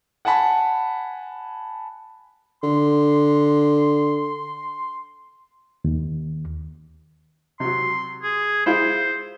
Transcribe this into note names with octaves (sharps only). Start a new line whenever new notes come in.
F#5 G#5 A5 B5
D3 C6
D#2
C3 F#3 C6
G#4
E4 F4 G#4 C5